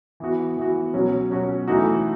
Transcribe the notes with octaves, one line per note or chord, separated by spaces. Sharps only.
E3 B3 F#4
E3 B3 F#4
B2 F#3 C#4 F#4
B2 F#3 C#4 F#4
E3 A3 D#4 F#4